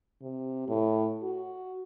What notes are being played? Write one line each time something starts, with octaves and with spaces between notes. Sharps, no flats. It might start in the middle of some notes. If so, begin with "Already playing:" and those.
C3
A2
F#4